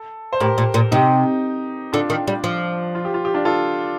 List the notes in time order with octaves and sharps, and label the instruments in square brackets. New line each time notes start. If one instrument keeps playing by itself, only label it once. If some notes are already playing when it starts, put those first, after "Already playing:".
Already playing: [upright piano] A4
C5
[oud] A2 [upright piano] G4 A#4
[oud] A#2
A#2
[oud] C3 [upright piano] D#4 G4
[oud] D3 [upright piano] D4 F4
[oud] D#3
G3
F3
[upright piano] F4
G4
F4
G4
D4 F4
F4 A4